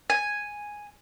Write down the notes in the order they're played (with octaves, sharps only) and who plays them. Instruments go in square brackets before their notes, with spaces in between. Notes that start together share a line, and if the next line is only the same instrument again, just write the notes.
[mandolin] G#5